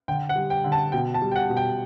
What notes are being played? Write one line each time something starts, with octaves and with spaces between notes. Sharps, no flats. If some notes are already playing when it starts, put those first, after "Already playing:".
D3 G5
F#5
G3
G5
D3
A5
B2 G5
A5
G3
G5
F#5
B2
G5